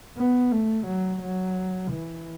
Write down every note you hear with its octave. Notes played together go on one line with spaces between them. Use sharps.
B3
A3
F#3
F#3
E3